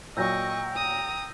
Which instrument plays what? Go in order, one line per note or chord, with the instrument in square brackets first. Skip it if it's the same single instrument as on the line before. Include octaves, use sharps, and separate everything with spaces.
[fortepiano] A#2 F#3 [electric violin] D#5 C#6 [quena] G5 [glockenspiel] E6 G6 A#6
[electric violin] A#5 D#6